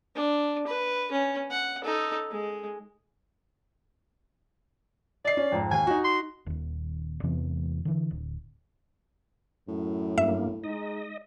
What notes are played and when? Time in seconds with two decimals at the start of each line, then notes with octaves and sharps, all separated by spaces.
0.15 D4
0.67 B4
1.12 C#4
1.51 F#5
1.84 D#4 A4
2.31 G#3
5.25 D5 D#5 C7
5.37 C#4
5.52 F2 G#2
5.71 D#2 G#5
5.87 D#4 F#4
6.05 C6
6.46 D#1 D#2
7.23 E2 C3 E3 B3
7.85 D3 E3
8.11 D1
9.68 F#2 A2
10.18 G2 A#3 E5
10.64 G#3 D#4 D#5